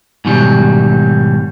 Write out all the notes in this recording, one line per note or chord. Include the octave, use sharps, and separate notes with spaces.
G#2 B2 D#3 F#3 G3